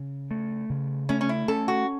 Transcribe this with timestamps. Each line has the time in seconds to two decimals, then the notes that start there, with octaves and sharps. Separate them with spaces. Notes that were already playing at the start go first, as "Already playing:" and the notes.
Already playing: C#3
0.31 A3
0.70 C#3
1.09 A3 C#4
1.21 C#4
1.29 E4
1.48 C#4 A4
1.68 F#4